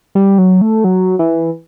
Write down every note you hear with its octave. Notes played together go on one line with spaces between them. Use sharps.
G3
F#3
A3
F#3
E3